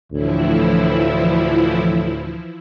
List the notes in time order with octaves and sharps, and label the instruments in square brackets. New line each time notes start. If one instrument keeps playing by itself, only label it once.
[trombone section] D2 A2 [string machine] E3 F3 E4